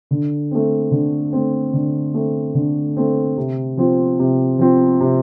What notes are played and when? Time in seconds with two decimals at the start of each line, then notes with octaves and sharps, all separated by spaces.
0.11 D3
0.51 A3 C4
0.91 D3
1.33 A3 C4
1.73 D3
2.14 A3 C4
2.55 D3
2.97 A3 C4
3.37 C3
3.77 F3 C4
4.19 C3
4.59 F3 C4
5.00 C3